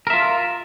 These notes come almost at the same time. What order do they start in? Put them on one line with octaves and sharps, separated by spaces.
A#4 E5 F4